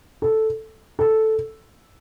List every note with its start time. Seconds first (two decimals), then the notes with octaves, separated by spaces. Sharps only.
0.22 A4
0.99 A4